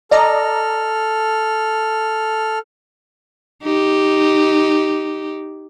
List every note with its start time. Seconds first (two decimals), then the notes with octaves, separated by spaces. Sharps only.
0.11 A4 D5 D#5 A#5 F6
3.63 D#4 G4